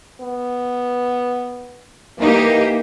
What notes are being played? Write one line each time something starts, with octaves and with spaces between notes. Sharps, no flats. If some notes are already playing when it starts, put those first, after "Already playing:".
B3
E3 A#3 D#4 G4